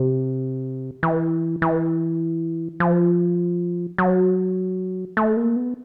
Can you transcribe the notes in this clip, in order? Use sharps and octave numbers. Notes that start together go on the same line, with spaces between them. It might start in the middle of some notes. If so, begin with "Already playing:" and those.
Already playing: C3
E3
E3
F3
F#3
A3
A#3
B3